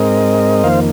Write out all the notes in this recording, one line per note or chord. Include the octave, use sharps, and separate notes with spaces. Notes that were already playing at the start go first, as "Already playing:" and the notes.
Already playing: G#2 G#3 C4 A#4 D#5
F2 D#3 A#3 C5 F5